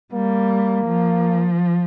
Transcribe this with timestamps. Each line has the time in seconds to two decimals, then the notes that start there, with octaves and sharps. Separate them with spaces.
0.13 G3 A#3
0.86 F3